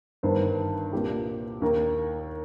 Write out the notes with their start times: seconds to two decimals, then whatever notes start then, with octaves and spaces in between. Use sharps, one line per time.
0.23 G1 G2 D#3 C5
0.93 C2 A#2 G4
1.62 D#2 D#3 A#4